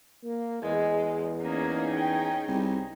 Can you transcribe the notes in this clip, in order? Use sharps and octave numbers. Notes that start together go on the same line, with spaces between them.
A#3
E2 G#3
A#3 C#4 D#4 G#4
G5
C2